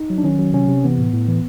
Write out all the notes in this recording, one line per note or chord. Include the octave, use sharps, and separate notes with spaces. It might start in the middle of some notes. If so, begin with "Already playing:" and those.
Already playing: D#4
F#3
D4
D#3 C#4
F#3
C3 C#4
C3
E3 B3
A2
A2
E3